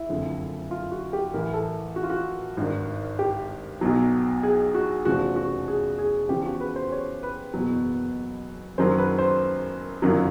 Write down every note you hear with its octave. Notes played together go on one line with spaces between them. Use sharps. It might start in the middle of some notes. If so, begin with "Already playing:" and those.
Already playing: E4
F#1 F2 D3
F4
F#4
G4
A1 A2 E3 A#4
A4
F#4
F4
F#4
G#1 G2 D#3
G4
B1 B2 F#3
G#4
F#4
F1 E2 C#3 F3 F#4
F#4
G#4
G#4
E2 C#3 F3 G4
F#4
B4
C5
C#5
B4
F#1 E2 B2 F#3
F#1 F#2 D#3 F#3 C5
B4
C5
G1 F#2 D#3 F#3